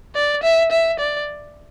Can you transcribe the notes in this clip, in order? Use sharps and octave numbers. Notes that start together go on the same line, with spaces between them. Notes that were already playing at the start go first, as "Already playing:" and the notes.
D5
E5
E5
D5